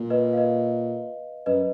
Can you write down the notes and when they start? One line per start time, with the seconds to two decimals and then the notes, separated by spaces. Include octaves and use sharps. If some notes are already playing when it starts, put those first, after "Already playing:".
Already playing: A#2
0.10 B4 D#5
0.33 F5
0.37 B4 D#5
1.46 F#2 B4 D#5